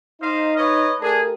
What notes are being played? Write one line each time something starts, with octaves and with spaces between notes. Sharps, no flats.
D#4 C5 D#5 F5
B4 C#5 D#5
A3 D4 G4 G#4 A#4